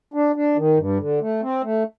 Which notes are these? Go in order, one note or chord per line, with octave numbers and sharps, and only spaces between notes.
D4
D4
D#3
G2
D3
A3
C4
A3